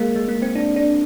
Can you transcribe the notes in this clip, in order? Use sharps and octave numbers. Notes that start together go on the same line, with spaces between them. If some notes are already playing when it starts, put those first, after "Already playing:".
Already playing: G#3 A#3
G#3
A#3
C4
D4
D4